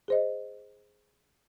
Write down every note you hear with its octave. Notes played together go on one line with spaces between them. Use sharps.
G#4 C5 D#5